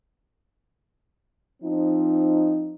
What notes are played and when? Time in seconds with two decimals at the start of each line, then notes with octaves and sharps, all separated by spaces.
1.63 F3 C4 D#4